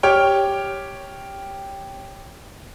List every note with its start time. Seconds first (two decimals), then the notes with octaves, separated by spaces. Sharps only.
0.03 G4 C#5 G5 F6